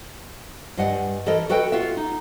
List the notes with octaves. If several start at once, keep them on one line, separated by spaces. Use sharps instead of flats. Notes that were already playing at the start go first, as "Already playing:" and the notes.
G2 G3 D#5 F#5 G#5
E3 A4 A#4 D#5
F#4 A4 B4 D#5 G5
F4 F#4 E5
D#4